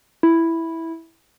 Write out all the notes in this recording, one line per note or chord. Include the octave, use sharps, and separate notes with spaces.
E4